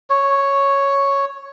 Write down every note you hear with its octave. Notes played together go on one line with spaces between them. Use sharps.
C#5